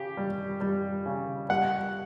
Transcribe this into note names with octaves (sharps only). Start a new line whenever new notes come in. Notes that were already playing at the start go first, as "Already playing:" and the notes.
Already playing: C#3 G4
G3
G3
C#3
G3 F#5